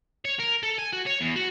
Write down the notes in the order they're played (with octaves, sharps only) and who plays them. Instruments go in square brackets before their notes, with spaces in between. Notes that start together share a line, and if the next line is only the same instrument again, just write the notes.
[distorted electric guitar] C#5
A#4
A4
G#5
F#4
C#5
E2
F#4